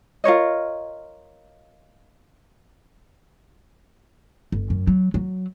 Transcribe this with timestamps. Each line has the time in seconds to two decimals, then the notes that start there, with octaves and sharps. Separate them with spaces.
0.24 F4 A#4 C#5 D#5
4.52 G1
4.70 F#2
4.87 F#3
5.14 F#3